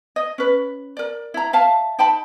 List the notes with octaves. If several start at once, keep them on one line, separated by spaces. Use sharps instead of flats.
D#5
C#4 B4
A#4 D5
E4 A#5
E5 F5 A5
D#4 G5 A5 B5